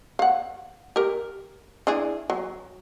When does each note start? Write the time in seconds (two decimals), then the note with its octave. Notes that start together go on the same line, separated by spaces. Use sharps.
0.19 F5 F#5
0.96 G4 A#4
1.87 D4 E4 G#4
2.30 F#3